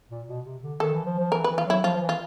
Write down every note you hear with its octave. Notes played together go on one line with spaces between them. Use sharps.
A#2
B2
C3
D3
D#3 A4
E3
F3
F3
E3 A#4
B4
E3
F4
F#3 E4
F3 F4
F3
E3
F4